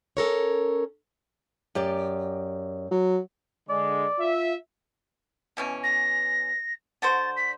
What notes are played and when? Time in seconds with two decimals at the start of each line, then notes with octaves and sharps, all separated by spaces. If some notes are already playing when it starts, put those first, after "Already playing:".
0.17 C#4 A4 A#4 C#5
1.75 F#2 G4 D5
2.91 F#3
3.69 D3 G#3 D5
4.19 F4 E5
5.57 B2 E3 C#4
5.83 A#6
7.02 D3 F#4 C5 A6
7.36 B6